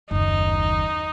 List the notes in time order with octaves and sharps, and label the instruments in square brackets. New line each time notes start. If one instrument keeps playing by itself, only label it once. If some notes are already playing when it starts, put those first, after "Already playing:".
[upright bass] F#1 D#2 [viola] D#4